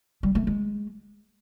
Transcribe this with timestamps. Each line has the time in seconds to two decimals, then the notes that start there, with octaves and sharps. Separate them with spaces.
0.23 G3
0.35 A3
0.47 G#3